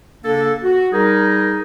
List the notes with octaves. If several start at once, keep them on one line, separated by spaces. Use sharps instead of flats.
C#3 A#3 D4 A4
F#4
G3 D#4 G#4 A#4